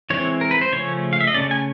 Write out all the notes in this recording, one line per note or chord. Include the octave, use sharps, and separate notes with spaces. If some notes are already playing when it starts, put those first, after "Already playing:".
E3 G#3 C4 E4 C#5
A#4
B4
C5
C#3 F3 A3 C#4 C#5
F5
E5
D#5
C#3 F3 A3 C#4 D5
G#5